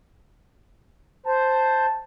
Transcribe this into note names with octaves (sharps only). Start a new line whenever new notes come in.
C5 A5